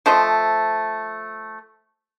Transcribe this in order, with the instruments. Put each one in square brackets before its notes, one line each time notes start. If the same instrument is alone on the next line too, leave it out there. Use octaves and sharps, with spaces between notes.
[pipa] F3 A3 C5 D#5